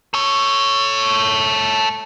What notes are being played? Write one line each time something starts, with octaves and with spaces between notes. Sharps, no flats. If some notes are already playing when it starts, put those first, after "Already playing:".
A4 C#5